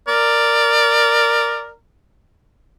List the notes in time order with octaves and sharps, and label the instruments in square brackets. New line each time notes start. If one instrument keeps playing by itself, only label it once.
[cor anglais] A#4 [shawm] D5